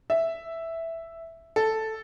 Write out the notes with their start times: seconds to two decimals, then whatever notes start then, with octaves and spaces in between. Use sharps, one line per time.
0.10 E5
1.56 A4